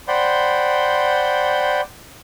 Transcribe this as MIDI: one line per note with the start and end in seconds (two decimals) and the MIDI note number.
0.08 1.81 72
0.08 1.81 74
0.08 1.81 78
0.08 1.81 79
0.08 1.81 83
0.08 1.81 84